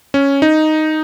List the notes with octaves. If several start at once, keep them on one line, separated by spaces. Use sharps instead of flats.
C#4
D#4